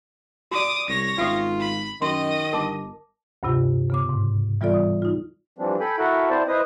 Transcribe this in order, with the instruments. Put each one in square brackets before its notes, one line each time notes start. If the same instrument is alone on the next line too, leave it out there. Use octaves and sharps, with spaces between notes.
[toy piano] F#4 D5 [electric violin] D6 D#6
[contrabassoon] C2 [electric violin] C#5 A#6
[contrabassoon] G#1 [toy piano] C#4 E5 D#6 [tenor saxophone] F4
[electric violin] B5
[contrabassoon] F#2 [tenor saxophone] D#3 [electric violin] D#5 [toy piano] C6
[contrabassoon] G1 [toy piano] A#4 A5 D6
[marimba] D2 G2 C3 F4
C#3 B3 D6
G#2
E3 G3 B3 F4 A4 D5
D#6
D#4 F4
[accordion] E3 F3 G3 C4 D4
A4 G5 G#5 B5
E4 F#4 A4 A#4 E5 F#5
C4 E4 C5 D5 A5
E4 B4 C5 D#5 D#6